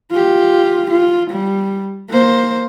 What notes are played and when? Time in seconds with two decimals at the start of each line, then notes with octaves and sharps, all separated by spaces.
0.11 F4 G4
0.91 F4
1.31 G3
2.09 A#3 C5